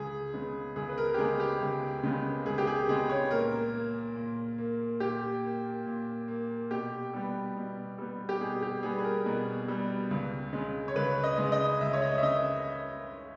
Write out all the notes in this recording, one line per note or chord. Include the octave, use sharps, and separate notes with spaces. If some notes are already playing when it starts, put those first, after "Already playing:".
Already playing: C#2 G#4
C#3 G#3 B3
C#2 G#4
B4
A#4
G4
C#3 G#3 B3 G#4
G4
C#2
C#3 G#3 B3
C#2 G#4
G4
G#4
C#3 G#3 B3 G#4
C#5
A#2 A#4
A#3
A#2
A#3
A#2 G4
A#3
A#2
A#3
B2 G4
G3 B3
B2
G3 B3
G4
B2 G#4
G4
G3 B3 G#4
G#4
A#4
B2
G3 B3
C#2
C#3 G#3
C#5
C#2 B4
D#5
C#3 G#3
D#5
C#2 E5
C#5
D#5
E5
C#3 D#5